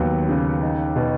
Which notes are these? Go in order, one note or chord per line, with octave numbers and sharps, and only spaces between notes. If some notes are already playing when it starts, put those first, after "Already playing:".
Already playing: D#2 F#3 B3
C#3
D#4
B2